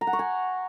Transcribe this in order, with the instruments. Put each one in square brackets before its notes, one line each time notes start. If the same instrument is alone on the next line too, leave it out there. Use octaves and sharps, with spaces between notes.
[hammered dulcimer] A#5
F#5
C#6
G#5